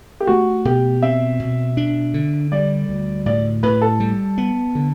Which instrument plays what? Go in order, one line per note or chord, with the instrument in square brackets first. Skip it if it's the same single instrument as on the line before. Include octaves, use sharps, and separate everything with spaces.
[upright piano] G4
[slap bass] A3 [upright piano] F#4
[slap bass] B2 [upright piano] G4
[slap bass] C4 [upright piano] E5
[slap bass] B2
D4
D3
[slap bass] G3 [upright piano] D5
[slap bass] D2
[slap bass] A2 [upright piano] D5
[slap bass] A2 [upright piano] B4
[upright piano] A4
[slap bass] G3
B3
D3